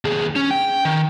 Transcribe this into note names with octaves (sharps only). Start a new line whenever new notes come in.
D#2 G#4
C#4
G5
D#3